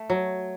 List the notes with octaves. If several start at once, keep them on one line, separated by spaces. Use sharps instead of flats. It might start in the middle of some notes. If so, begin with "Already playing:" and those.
Already playing: A3
F#3